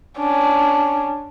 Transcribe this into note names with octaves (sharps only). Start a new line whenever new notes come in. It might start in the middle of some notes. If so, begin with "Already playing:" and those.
C#4 D4